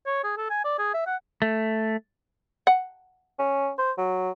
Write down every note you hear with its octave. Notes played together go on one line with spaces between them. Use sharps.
C#5
G#4
A4
G#5
D5
G#4
E5
F#5
A3
F#5
C#4
C5
F#3